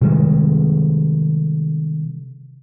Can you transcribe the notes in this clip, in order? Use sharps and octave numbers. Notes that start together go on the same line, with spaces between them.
C3 D#3 G3 G#3